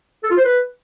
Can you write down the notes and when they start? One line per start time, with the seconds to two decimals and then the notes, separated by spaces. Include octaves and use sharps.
0.23 A4
0.31 F4
0.38 C5
0.45 B4